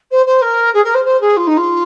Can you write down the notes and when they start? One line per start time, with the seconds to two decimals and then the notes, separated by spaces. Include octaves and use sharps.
0.11 C5
0.26 C5
0.41 A#4
0.73 G#4
0.84 A#4
0.94 C5
1.05 C5
1.20 G#4
1.36 F4
1.47 D#4
1.57 F4